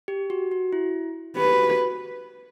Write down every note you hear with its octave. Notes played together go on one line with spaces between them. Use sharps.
G4
F#4
F#4
E4
G4 B4
F#4